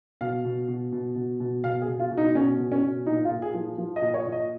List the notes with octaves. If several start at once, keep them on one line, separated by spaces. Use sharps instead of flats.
B2 F5
B2
B2
B2
B2
B2
B2 F5
G#4
B2
F4
B2
D#4
B2 C#4
B2
C#4
B2
A#2 D#4
F4
A#2
G#4
F3
F3
D#5
A#2
C#5
A#2
D#5